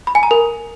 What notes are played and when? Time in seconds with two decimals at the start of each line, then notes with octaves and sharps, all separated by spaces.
0.07 B5
0.15 G#5
0.23 A#5
0.31 A#4